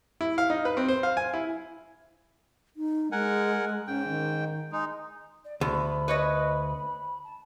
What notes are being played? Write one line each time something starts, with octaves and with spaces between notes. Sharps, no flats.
E4
F5
D#4
B4
C4
C5
F5
G#5
E4
D#4
G#3 A#4 F#5 G#5
G#2 C#4 G5
D#3
G#3 D#4
D5
D2 B5
B4 C#5 D#5
A5